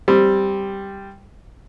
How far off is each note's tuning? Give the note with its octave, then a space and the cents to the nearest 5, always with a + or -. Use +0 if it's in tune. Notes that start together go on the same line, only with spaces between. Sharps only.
G3 +0 C4 +0